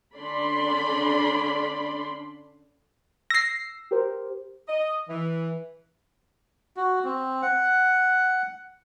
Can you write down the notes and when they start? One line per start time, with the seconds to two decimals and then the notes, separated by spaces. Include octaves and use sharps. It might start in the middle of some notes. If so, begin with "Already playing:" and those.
0.17 D3 C#4 D4 D5 B5 C6
3.30 E6 A#6 C7
3.91 G4 A#4 C5
4.68 D#5
5.09 E3
6.77 F#4
7.04 C4
7.42 F#5